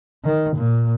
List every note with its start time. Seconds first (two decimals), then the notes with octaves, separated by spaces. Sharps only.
0.24 D#3
0.56 A#2